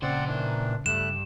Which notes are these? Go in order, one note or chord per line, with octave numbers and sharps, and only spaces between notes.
A#2 C#3 C4 C5 D5 F#5
D#3 E3 D4
G2 A3 F#6 E7